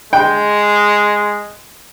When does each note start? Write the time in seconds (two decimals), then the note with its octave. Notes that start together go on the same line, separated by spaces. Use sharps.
0.13 G#3 G5